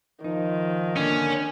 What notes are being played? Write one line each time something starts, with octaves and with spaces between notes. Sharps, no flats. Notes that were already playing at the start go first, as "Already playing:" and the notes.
D#3 F3 D#4
D3 A#3 C#4 D4